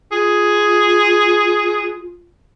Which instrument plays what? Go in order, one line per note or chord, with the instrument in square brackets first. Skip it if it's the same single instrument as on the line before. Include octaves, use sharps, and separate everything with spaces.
[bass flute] F4 [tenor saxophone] G#4